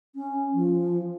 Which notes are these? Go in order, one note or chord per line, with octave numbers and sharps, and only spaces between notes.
C#4
F3